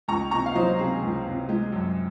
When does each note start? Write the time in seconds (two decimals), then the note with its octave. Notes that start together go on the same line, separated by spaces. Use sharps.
0.08 C#2 A#5 C#6
0.31 C3 A#5 C#6
0.46 F5
0.55 F#3 C5 D#5
0.79 C3 G#4
1.02 C#2
1.26 C3
1.49 G#3
1.72 F#2